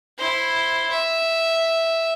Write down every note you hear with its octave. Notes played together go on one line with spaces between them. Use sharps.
E4 C5
E5